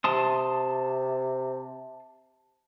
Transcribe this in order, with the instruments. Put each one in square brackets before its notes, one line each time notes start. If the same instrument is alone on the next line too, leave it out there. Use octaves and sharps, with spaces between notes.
[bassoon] C3 [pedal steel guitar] A5 C6 D#6